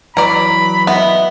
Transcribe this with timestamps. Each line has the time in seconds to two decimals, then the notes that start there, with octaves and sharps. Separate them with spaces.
0.17 E3 F#3 B4 D5 A#5 B5
0.87 B3 D#5 E5 F#5